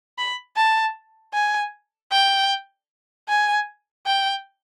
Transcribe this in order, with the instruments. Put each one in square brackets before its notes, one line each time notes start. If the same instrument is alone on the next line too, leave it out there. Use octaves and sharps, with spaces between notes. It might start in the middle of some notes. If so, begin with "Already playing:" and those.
[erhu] B5
A5
G#5
G5
G#5
G5